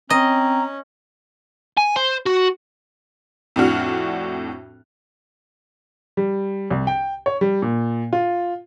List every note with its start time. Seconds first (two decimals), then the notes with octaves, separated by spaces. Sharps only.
0.10 C4 C#4 D#5 A#5
1.77 G#5
1.96 C5
2.26 F#4
3.56 F2 A2 D4 F#4 F6
6.17 G3
6.71 C2
6.87 G5
7.26 C#5
7.41 G3
7.62 A#2
8.13 F4